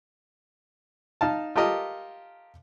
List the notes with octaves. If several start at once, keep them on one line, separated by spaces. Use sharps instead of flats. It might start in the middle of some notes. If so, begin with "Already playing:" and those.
D#4 F5 A5
F4 G4 A4 A#4 D#5